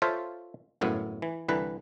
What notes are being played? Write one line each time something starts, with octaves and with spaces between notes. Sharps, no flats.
F4 A4 C5 C#5 E5 F5
G1 F#2 A2 B3
E3
C2 D3 E3 B4